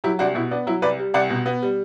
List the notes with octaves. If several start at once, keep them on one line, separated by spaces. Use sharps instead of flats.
F#3 E4 G4
C2 D4 F#4
B2 E4
B3 D4
F#3 E4
C2 B4 D5
G3
C2 D5 F#5
B2
B3
G3